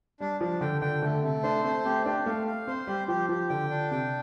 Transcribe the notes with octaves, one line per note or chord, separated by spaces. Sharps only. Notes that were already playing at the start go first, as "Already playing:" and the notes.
G3 D4
F3 D4
D3 G5
D3 G5
D3 A3
C3 A3
D4 C5
A3 C4
C4 G4
D4 G4
A3 F5
F5
C4 C5
G3 G4
F3 G4
F3 G4
D3 G5
D4
C3 G5